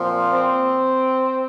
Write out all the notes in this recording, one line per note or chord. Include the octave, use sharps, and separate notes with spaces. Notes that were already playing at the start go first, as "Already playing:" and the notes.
Already playing: A#2 F3 C4
C4